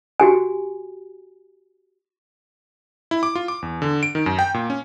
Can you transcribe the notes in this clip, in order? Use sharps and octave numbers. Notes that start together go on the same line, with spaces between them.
F#4 G4 G#5
E4
D6
F4
D6
E2
D3
D7
D#3
F#2
G5
A#2
C#4